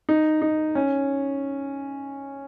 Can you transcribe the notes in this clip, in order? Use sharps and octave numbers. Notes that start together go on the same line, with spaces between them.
D#4
D#4
C#4